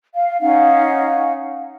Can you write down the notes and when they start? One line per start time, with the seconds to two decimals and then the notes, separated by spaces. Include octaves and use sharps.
0.15 F5
0.41 C#4 D#4 F5 F#5